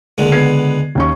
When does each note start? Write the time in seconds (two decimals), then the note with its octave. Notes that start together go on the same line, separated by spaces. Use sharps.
0.18 C#2 D3 G#3 A#3
0.32 B3 G#6 C7
0.95 D#2 C#4 C#6